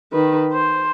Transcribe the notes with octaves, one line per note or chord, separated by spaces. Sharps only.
D#3 B4
C5